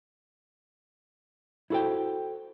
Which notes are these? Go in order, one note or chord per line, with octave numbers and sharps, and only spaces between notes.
E4 F#4 A4 C5 G5